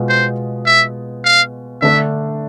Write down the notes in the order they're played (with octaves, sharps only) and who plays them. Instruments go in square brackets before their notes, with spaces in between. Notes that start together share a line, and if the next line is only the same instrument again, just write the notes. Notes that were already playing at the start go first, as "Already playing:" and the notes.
Already playing: [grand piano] B2 G#3 F4
[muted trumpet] C5
E5
F5
[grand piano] D3 A3 D4 [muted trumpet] E5